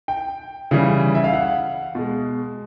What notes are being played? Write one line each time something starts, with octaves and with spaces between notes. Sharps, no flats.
G5
C#3 E3 G3
E5
F5
F#5
B2 G#3